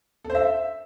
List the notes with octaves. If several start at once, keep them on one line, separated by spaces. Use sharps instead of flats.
A4
C5
E5